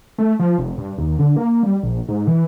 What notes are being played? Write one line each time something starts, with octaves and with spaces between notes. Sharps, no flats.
A3
F3
F1
G2
D#2
D3
A#3
G3
A#1
G#2
E3